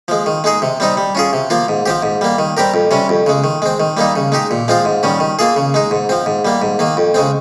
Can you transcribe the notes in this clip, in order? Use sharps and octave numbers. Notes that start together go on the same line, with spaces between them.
F3 G#3
D#3
G#3 D#4 G#4
C3
G3 C4 D#4
G3
C#4 F4 G#4
C3
F3 A#3 F4
G#2
F3 C4 G4
G#2
G3 A#3
D#3
G3 C4 G4 A#4
F2
C3 G3 C#4
F2
C#3 G#3
D#3
G#3 C4
D#3
G3 A#3 D#4
C#3
G#3 D#4 G4
A#2
F3 G#3 C4 F4
G#2
D#3 G3 C#4
D#3
A#3 F4 G#4
C#3
G#3 D#4
G#2
F3 C4
G#2
G3 A#3
G#2
D#3 A#3
F2
C#3 G#3 C4